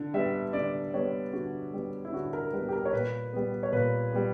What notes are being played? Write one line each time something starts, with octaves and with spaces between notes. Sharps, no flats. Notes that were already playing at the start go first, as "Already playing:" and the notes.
Already playing: D3
G3 B3 E5
D3 D5
G3 B3 C#5
D3 F#4
G3 B3
E4
D3 F#4
A#4
G3 B3 B4
G4
A#4
C#5
A#2 B4
G3 B3
C#5
A#2 B4
G3 B3